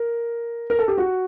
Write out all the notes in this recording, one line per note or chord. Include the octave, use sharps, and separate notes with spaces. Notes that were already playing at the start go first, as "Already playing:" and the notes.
Already playing: A#4
A#4
A4
G4
F#4